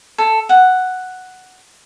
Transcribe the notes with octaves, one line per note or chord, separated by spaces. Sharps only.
A4
F#5